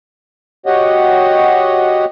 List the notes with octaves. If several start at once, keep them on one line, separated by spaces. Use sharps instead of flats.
F#4 G4 C#5 D#5 F#5